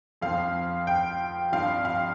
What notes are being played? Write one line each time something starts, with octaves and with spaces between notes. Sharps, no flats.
F2 F3 C4 F5
G5
G2 F3 C4 F5
F5